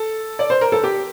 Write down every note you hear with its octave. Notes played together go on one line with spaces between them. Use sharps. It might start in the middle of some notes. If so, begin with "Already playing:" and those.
Already playing: A4
D5
C5
A#4
A4
G4